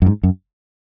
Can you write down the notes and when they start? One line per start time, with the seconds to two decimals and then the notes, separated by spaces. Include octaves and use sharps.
0.02 F#2
0.06 G#2
0.23 F#2